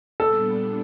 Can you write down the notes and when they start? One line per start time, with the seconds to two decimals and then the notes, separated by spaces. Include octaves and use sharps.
0.20 A#2 G3 B3 D4 A4